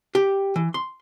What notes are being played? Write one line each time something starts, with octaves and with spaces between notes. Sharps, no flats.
G4
E3
C6